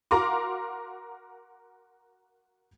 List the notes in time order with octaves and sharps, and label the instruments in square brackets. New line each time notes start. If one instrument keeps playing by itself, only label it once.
[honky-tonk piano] F#4 A#4 F5 A#5 C6 D6